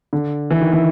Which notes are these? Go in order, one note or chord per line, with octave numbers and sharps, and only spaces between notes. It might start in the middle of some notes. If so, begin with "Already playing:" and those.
D3
E3
D#3
E3